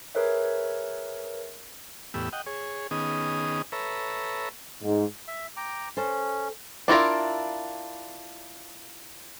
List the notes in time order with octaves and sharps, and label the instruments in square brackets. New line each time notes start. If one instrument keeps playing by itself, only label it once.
[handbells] G#4 A#4 B4 C#5 E5
[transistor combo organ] E2 A2 B3 G4 E6
D#5 F#5 G5
G#4 C#5
D#3 B3 C#4 D#4 G#4 D#6
A4 B4 C#5 E5 A#5
[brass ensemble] G#2
[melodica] E5
G5 A#5 D6
[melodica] C#4 [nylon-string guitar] A4 C5
[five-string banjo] D4 E4 F4 A#4